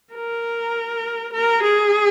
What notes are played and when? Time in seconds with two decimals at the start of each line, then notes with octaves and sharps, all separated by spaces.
0.14 A#4
1.34 A#4
1.63 G#4